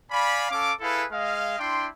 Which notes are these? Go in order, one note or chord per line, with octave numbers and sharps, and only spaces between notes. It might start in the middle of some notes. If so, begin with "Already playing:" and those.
D5 F5 G#5 B5
C#4 A4 F5 D6
E4 G#4 A4 B4 F5
G#3 D#5 F5
D4 E4 G5 C6